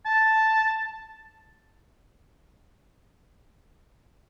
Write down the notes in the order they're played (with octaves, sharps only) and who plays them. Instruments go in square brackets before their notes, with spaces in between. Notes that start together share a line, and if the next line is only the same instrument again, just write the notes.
[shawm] A5